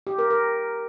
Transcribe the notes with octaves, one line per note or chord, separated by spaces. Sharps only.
G4
A#4
A#4